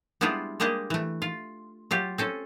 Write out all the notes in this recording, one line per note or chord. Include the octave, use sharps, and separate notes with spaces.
G3 G#3 B3 D4 E4 F4
G3 G#3 A#3 D4 G4 D#5
E3 A3
F4
F#3 F4 G4
C4 C#4 A4